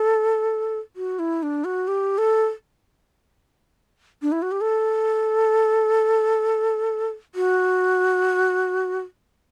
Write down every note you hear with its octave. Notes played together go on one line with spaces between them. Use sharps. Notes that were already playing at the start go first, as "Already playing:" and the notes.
Already playing: A4
F#4
E4
D4
F#4
G4
A4
D4
E4
F#4
G4
A4
F#4